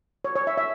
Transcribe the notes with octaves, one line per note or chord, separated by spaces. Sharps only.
C#5
C#5
E5
E5